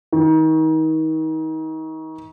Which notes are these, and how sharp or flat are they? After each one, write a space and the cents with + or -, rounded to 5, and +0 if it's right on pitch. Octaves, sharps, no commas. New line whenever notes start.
D#3 +35